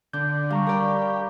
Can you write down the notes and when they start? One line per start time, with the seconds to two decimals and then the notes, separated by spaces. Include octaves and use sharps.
0.13 D3 D4 G6
0.51 G3 F5 A#5 C#6
0.67 G4 A#4 D5 B5